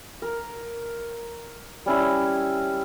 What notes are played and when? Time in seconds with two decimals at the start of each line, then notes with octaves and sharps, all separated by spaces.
0.22 A#4
1.86 G3 C#4 E4